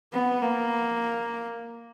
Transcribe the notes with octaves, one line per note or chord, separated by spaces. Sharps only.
B3
A#3